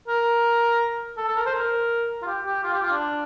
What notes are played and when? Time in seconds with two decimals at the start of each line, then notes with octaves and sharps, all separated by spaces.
0.08 A#4
1.17 A4
1.28 A4
1.36 A#4
1.46 C5
1.55 A#4
2.22 F4
2.27 G4
2.46 G4
2.64 F4
2.74 G4
2.82 F4
2.92 D4